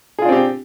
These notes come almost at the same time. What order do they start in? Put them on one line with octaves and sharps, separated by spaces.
G#4 F4 D4 C4 G4